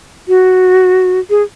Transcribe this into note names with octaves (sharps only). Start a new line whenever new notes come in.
F#4
G#4